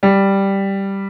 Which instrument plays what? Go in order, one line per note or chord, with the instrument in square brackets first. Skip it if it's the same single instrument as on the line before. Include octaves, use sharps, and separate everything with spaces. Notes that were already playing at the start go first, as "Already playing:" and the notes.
[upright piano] G3